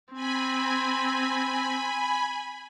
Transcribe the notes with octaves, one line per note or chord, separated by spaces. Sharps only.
C4 G#5 B5